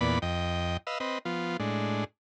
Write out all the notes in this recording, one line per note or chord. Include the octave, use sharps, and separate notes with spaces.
E2 A#2 B3 D5 B5
F2 D#5 G5
B4 D#5 F5 E6
C4 B4 D#5
F3 B3 F4
A2 G#3 D4